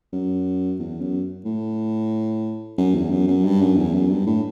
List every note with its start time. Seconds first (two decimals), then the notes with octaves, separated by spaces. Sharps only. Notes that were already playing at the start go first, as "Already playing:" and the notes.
0.13 F#2
0.79 E2
1.01 F#2
1.45 A2
2.78 F#2
2.95 E2
3.11 F#2
3.28 F#2
3.44 G2
3.61 F#2
3.77 E2
3.94 F#2
4.11 G2
4.27 A2